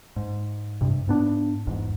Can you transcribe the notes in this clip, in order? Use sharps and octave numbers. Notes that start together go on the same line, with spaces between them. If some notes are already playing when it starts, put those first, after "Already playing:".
G#2
G2 C3
G#2 B3 D4
G1 E2 G#2